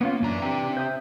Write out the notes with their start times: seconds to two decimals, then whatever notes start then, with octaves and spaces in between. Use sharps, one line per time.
0.01 A#3 B3 C#4 F4
0.22 F#2 E3 D4 A#5
0.42 C4 G4
0.77 C5 E5 D#6